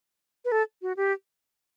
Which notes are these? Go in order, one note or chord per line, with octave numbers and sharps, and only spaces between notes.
B4
A4
F#4
G4